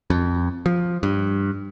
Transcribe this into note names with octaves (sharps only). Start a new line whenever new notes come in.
F2
F3
G2